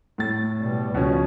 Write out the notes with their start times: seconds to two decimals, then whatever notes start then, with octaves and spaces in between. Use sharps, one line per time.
0.18 A2 A6
0.60 B2 G3
0.95 C#2 B2 F3 C#4